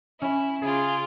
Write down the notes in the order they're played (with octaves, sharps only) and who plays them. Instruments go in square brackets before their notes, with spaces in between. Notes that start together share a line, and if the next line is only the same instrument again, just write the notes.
[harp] C#4 [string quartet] E4
[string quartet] C#3 F4 D6 [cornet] G#4 [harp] C7